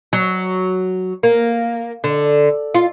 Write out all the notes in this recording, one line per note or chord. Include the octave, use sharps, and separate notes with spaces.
F#3
A#3
D3
F4